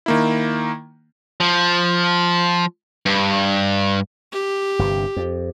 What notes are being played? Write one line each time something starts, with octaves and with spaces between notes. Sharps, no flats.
D#3 A#3 E4
F3
G2
G4
G1 G2 C3
F2